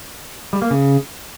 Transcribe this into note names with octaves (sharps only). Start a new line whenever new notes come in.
G3
A#3
C#3